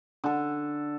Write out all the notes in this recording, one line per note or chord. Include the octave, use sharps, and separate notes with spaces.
D3 A4